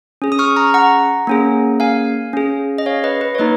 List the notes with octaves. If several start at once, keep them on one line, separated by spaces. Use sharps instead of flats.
C#4 G#4
D#6
C#6 F6
A#5 C#6
F#5 A#5
A#3 C#4 G#4
F5 G#5
C#4 G#4
D#5
C#5 F5
B4 D#5
B4
C#5
A#3 D#4 B4 D#5